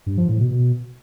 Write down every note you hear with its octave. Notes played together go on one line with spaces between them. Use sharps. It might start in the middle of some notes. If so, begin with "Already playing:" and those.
G2
F3
A2
B2
B2